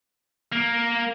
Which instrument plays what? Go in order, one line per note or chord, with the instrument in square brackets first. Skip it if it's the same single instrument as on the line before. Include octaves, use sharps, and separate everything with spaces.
[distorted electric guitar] A#3